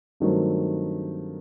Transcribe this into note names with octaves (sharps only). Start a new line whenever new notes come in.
G2 D#3 F#3 A3 C4